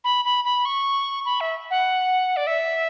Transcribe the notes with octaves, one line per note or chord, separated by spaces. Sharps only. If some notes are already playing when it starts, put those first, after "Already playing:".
B5
B5
B5
C#6
B5
E5
F#5
D5
E5